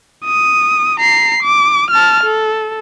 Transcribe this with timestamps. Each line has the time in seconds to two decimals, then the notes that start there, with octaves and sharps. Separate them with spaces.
0.26 D#6
1.00 A#5 C7
1.43 D6
1.91 A5 F6
2.23 A4